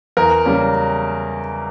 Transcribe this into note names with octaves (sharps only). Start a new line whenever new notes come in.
E2 A#4
C#3 G3 A#3 C#4